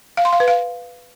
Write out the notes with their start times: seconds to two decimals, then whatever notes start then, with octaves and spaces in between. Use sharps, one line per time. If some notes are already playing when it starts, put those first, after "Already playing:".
0.17 F5
0.25 C6
0.33 F5
0.40 B4
0.48 F5